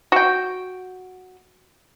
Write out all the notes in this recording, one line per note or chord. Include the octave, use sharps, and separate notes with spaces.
F#4 G5